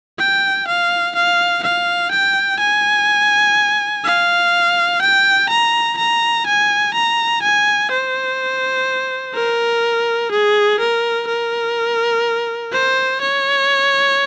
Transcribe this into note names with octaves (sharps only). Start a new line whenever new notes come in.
G5
F5
F5
F5
G5
G#5
F5
G5
A#5
A#5
G#5
A#5
G#5
C5
A#4
G#4
A#4
A#4
C5
C#5